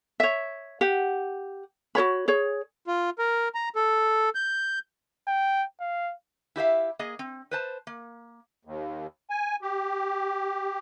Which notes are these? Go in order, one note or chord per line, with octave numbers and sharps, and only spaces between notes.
C#5 E5
G4 F#5
F#4 A4 C#5 B5
G#4 C#5
F4
A#4
A#5
A4
G6
G5
F5
E4 G4 E5 F5
A#3 G#4 D#5
C4
B4 C5 A5
A#3
D#2
G#5
G4